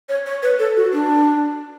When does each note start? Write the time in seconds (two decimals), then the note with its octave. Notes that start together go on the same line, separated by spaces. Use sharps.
0.09 C#5
0.26 C#5
0.43 B4
0.59 A4
0.77 F#4
0.93 D4